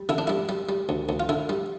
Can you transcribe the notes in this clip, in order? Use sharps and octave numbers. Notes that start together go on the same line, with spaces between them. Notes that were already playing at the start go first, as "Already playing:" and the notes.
Already playing: G3
D3 E4
D4
G3 E4
G3
G3
D2
D2
F4
D3 E4
G3